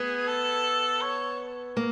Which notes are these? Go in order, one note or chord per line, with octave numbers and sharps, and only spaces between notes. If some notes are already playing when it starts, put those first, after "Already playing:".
Already playing: B3 G#4
A4
C#5
A#3